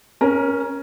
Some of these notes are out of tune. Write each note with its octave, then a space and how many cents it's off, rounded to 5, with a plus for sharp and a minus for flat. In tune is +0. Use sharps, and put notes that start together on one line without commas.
C#4 +0 A#4 +20